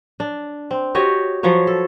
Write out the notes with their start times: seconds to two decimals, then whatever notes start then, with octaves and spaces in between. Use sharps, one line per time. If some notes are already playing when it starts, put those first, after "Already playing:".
0.20 D4
0.71 C4
0.95 F#4 G4 C#5 D#5
1.43 F3 F#3 B4 C#5
1.67 A4